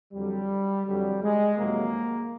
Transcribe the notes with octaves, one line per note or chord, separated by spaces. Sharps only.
F2 D3 F#3 G3
F2 D3 F#3 G3
G#3
F2 C3 D#3 F#3 A#3